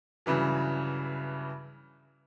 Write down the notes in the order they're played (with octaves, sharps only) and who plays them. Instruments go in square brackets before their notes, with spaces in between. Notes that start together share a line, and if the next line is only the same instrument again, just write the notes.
[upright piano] G2 C#3 E3 F#3